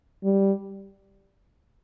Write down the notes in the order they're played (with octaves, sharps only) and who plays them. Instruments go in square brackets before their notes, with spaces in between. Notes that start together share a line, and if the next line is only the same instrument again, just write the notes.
[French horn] G3